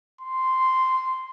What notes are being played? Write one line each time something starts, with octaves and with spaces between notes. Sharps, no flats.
C6